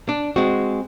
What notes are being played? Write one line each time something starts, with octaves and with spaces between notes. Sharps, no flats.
D4
G#3 C4 F#4